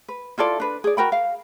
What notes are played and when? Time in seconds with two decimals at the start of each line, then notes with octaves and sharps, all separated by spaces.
0.08 B4
0.38 E4 F4 A4 D5
0.60 D4 B4
0.84 G#4 D5
0.97 F#4 A#4 G5 B5
1.12 F5